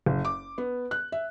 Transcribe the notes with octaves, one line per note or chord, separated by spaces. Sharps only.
F#1
D6
B3
F#6
E5